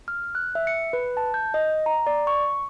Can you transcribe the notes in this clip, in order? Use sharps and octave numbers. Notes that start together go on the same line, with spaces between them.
F6
F#6
E5
C#7
B4
A5
G6
D#5
A#5
D5
C#6